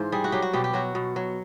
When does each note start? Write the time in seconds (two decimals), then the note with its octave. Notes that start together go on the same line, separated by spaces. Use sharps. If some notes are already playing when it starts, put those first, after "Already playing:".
Already playing: G#2 E3 C5 F5
0.12 G3 G#4
0.24 F#4
0.32 F#3 G4
0.42 F#4
0.53 B2 G4
0.64 G4
0.73 F#3 F#4
0.95 B2
1.16 F#3